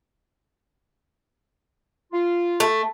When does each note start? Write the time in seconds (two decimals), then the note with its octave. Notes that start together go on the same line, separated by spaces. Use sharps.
2.12 F4
2.60 A3